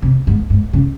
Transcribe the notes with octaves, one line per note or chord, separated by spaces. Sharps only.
C3
G#2
G#2
C#3